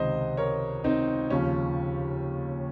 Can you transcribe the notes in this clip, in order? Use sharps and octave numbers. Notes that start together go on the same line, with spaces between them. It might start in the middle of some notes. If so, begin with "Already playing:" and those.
Already playing: C#2 C3 D#3 C5 D#5
A#4 C#5
C4 D#4
D#2 C#3 F3 C#4